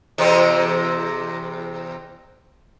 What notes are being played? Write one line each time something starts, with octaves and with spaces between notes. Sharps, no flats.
E2 C3 C4